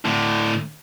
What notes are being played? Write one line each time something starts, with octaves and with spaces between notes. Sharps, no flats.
A2 D3